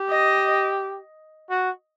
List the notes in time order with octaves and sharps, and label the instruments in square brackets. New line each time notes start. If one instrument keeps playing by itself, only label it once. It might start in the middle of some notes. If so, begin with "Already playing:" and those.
Already playing: [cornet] G4
[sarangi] D#5
[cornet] F#4